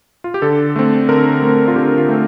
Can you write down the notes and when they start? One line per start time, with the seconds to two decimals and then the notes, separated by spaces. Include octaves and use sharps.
0.24 F4
0.34 G4
0.42 D3 A4
0.76 A3 C4
1.09 D3 A#4
1.42 A3 C4
1.68 F4
1.76 D3 G4
1.98 F4
2.09 A3 C4